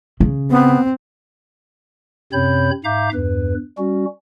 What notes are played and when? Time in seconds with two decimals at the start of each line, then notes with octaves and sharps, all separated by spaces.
0.20 C#3
0.50 B3 C4
2.33 F#2 C3 C4 C#5 B5 G6
2.84 G#2 E5 F5 A#5 D6 G6
3.13 E2 G2 B4
3.78 G3 C#4 F#4